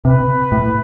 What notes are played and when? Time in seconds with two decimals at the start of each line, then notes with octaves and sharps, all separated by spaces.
0.04 C3 B4
0.52 A2